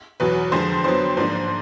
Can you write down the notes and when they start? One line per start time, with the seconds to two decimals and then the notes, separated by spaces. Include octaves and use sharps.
0.20 E2 B2 F#3 B4
0.52 F2 D3 F3 G#3 C5
0.84 F2 D3 F#3 B3 C5
1.17 G#2 F3 A#3 D4